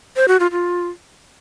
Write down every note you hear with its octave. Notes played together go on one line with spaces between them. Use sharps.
C5
F#4
F4
F4